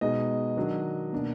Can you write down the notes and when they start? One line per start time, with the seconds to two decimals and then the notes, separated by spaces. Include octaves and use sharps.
0.01 B2 G#3 D#4 D#5
0.57 D#3 F#3 D4
1.12 B2 A#3 D4